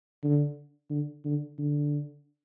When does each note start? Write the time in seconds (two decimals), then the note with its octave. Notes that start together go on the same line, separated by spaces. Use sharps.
0.23 D3
0.90 D3
1.25 D3
1.58 D3